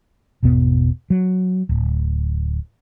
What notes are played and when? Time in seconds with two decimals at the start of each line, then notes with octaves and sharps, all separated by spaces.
0.43 G#1 E2 B2 B3
1.10 F#3
1.69 D1